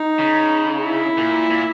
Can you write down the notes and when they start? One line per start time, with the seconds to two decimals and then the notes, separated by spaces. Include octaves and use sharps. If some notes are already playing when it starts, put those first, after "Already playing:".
Already playing: D#4
0.19 C#3
0.84 E4
1.18 A#2
1.50 A#2